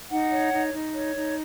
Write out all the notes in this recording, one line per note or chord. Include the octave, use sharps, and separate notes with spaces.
D#4 F#5
C#5
D#4
D#4
C#5
D#4